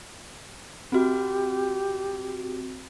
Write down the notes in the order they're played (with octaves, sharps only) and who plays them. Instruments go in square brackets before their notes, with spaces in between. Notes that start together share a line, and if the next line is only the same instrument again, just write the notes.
[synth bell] C4 F#4 [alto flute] G4